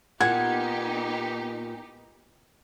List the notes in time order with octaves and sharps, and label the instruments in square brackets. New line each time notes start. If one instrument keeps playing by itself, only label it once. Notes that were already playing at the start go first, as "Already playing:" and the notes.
[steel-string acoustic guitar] A#2 [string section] B3 D#4 G4 [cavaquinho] F#5 [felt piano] G#6